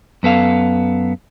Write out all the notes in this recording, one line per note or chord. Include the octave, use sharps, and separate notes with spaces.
F#2 B3 A4 F5